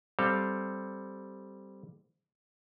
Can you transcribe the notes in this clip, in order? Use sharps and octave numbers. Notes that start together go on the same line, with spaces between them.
G3 C4 A4 F5